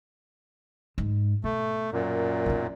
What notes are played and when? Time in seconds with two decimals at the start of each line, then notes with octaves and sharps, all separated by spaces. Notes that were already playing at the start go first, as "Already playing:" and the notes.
0.98 G#2
1.44 B2 A3
1.92 F#2 A#2
2.46 B1 B2